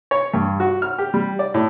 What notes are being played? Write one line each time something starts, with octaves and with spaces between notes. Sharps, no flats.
C#5
G2
F#4
F6
G4
G3
D5
A2